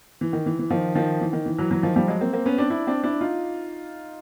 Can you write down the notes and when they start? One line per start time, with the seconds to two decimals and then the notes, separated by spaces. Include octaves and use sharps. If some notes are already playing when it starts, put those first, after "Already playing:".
0.21 E3
0.33 D#3
0.46 E3
0.59 E3
0.70 D#3 F3
0.95 D#3 F3
1.21 E3
1.33 D#3
1.46 E3
1.58 E3 F#3
1.71 E3 F#3
1.83 D#3 F3
1.96 F3 G3
2.08 F#3 G#3
2.21 A#3 C4
2.33 A#3 C4
2.46 B3 C#4
2.58 C4 D4
2.70 D4 E4
2.87 C4 D4
3.03 D4 E4
3.21 D#4 F4